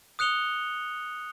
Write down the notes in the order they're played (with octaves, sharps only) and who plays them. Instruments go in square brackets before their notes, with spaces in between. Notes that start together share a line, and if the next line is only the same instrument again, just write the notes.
[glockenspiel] D#6 F#6 C#7 F7 G7